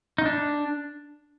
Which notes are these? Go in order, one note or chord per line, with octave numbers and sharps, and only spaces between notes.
D#4
D4